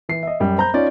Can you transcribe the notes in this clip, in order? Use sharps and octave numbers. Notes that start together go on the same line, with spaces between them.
E3 C7
D#5 E5
F#2 G3
C5 A#5 B5 G6
C#4 D#4 F4 D5